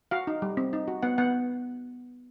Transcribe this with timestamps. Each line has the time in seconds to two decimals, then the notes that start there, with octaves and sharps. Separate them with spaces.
0.11 F#4 F5
0.27 D#4
0.42 G3
0.57 C4
0.73 D#4
0.88 F#4
1.03 B3 F#5
1.18 B3 F#5